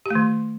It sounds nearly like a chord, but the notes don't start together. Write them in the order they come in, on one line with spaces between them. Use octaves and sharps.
G4 A3 D#3